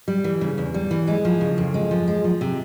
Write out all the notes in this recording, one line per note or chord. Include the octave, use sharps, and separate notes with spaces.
G3
E3
C#3
E2
G3
E3
G#3
F3
C#3
F2
G#3
F3
G#3
F3
C3